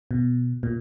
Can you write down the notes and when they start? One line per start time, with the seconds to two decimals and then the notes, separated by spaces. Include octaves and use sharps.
0.11 B2
0.63 A#2